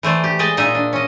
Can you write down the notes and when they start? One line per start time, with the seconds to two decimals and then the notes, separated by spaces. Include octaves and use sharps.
0.03 E3 A3 C5 D5
0.24 G4
0.39 G#3 G#4 D5 D#5 G5 A5
0.57 A#2 D#4 D#5 E5
0.75 D4
0.93 C#4 D#5